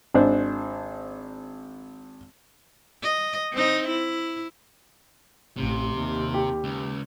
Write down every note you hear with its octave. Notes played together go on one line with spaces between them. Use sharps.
G#1 D4 C5
D#5
C4 D#4
E4
A1 C3
D#2
G4
C#2